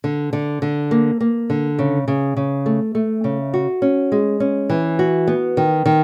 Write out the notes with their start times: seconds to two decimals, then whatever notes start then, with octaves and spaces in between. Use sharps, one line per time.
0.04 D3
0.33 D3
0.62 D3
0.91 A#3
1.20 A#3
1.50 D3
1.79 C#3
2.08 C#3
2.37 C#3
2.66 A3
2.95 A3
3.24 C#3
3.54 F#4
3.82 C#4
4.12 G#3
4.40 C#4
4.70 E3
4.99 F#4
5.27 B3
5.57 D#3
5.86 D#3